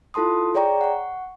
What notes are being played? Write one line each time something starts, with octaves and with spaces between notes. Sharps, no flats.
E4 F4 A4 A5 C6 D#6
G#4 C#5 D5 G5 A#5 C#6
F#5 C#6